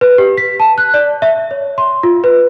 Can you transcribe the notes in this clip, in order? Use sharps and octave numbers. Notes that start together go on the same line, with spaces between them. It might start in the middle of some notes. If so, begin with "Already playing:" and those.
B4
G4
B6
A5
F#6
D5
E5
C#5
C6
F4
B4